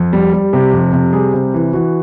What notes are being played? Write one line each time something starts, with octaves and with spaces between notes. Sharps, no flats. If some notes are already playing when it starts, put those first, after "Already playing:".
Already playing: F2
G3
G3
C3 G4
F2
C3
G3 G#4
C3
E3
E3 F#4